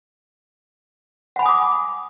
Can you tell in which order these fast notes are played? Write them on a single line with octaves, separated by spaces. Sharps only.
F#5 B5 G#5 D#6 D6